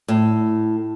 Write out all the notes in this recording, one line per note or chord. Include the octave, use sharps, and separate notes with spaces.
A2